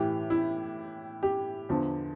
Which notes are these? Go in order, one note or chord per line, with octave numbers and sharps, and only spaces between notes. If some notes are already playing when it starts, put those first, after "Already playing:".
Already playing: A2 E3 G4
E4
G4
E2 D3 F3